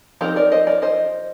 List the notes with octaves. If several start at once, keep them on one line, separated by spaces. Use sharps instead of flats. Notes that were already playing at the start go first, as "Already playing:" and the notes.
F3 C4 D#4 G4 A#4
A#4 D5
C5 D#5
A#4 D5
C5 D#5